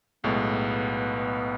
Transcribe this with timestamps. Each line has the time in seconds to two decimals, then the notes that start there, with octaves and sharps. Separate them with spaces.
0.24 B1 A2 G#3 B3